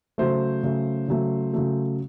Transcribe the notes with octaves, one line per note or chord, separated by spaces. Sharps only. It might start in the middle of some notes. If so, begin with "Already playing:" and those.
C#3 F#3 A3 C5
C#3 F#3 A3
C#3 F#3 A3
C#3 F#3 A3